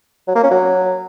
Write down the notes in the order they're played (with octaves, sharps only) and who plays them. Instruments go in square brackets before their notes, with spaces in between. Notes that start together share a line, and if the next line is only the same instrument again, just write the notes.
[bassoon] F#3
A#3
C#4
F#3